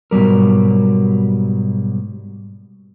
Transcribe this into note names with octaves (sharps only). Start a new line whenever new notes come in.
G#2 B2 F#3 G3 A#4